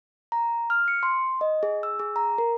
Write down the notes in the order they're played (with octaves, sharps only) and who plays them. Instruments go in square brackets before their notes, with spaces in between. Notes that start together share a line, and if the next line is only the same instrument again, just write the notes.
[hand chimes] A#5
F6
C#7
C6
D#5
G#4
E6
G#4
A#5
A#4